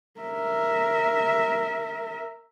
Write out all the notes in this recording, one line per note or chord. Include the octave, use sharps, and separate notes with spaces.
A#4 E5